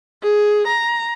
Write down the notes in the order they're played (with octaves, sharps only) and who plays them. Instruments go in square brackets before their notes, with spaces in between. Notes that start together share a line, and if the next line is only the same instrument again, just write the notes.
[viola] G#4
A#5